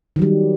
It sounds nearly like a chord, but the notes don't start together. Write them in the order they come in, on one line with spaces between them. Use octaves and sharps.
D#3 F#3 G3